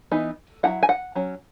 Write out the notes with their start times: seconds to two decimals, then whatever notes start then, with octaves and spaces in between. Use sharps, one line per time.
0.11 E3 B3 D#4
0.63 F#3 C#4 E4 F#5
0.83 G#5
0.89 F#5
1.15 F#3 C#4